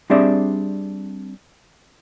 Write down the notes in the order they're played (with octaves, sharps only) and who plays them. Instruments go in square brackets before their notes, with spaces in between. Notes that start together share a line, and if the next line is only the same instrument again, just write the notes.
[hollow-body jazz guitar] G3 C4 D4 G#4 D5 E5